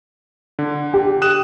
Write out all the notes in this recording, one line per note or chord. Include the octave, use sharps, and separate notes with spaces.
D3
G4
D#6 F#6 E7